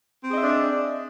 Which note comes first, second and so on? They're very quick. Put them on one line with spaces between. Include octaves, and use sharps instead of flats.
C4 G#4 D#5 E5 D4